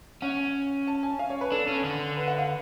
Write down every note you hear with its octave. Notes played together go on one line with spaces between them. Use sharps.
C#4 F#5
A5
G#5
F5
C#5
B4
D4 A4
C#4
D3
B4
F#5
F5